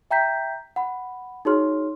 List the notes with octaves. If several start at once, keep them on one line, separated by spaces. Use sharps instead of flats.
E5 G5 A#5 G6 B6
F#5 B5
D#4 F#4 G#4 C#5 C6 F6